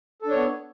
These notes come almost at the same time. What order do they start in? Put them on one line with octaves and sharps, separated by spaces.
A4 D4 C#5 B3